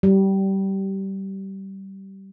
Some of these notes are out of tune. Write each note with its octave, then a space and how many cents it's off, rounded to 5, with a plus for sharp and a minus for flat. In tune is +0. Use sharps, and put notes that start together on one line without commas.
G3 -20